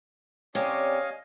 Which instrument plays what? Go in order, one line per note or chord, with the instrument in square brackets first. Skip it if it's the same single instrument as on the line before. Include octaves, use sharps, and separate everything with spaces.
[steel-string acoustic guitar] C3 G4 [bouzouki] C#4 [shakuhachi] D5 [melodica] D#5 F5 G#5